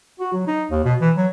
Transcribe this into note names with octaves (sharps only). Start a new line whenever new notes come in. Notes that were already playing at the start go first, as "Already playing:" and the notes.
F#4
F#3
D#4
D#2
B2
E3
F#3